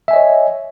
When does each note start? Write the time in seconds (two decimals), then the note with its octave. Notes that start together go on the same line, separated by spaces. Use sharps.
0.08 E5
0.11 G#5
0.13 D#5
0.16 C#5